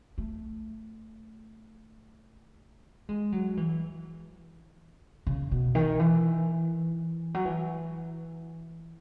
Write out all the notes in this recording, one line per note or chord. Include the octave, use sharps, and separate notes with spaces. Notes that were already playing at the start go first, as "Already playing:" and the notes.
A3
G#3
F#3
E3
C#3
B2
D#3
E3
F#3
E3